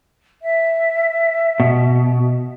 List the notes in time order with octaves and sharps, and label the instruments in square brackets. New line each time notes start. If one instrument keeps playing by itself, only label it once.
[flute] E5
[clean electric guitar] B2